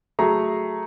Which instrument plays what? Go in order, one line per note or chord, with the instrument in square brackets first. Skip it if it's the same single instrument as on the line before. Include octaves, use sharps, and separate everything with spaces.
[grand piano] F#3 A3 G#4 A#5